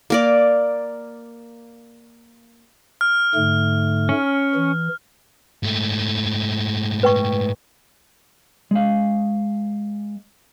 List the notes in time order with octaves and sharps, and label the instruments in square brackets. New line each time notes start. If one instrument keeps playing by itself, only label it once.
[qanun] A#3 A#4 D5
[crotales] F6
[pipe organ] G#2 D3 A3
[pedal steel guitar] C#4
[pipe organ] E3
[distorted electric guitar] G#2 A3
[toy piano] B4 G5 C#6
[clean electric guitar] G#3 F5